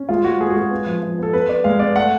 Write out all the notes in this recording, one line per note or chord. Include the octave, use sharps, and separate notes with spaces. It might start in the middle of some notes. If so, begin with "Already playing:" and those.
Already playing: C#4
G#3 F4
G#3 F#4
G#3 G#4
F#4
G#3 G#4
B3
F3
F3
B3 A4
B3 B4
B3 D5
G#3 F5
B3 D5
A3 F#5